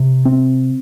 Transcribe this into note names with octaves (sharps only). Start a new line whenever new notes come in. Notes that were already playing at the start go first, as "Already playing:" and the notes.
Already playing: C3
C4